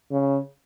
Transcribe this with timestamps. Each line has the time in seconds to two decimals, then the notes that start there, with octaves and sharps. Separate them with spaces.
0.11 C#3